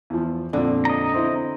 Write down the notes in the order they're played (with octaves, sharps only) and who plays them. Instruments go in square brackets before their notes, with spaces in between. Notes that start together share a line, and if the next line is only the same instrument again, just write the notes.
[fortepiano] E2 F3
[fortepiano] F2 A#2 [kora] D3
[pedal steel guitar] D#5 A#5
[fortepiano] C4 E4